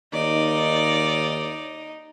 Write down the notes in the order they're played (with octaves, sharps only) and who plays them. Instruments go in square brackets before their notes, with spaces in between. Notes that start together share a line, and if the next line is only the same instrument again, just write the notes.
[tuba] D#2 [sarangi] D#4 [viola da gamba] D5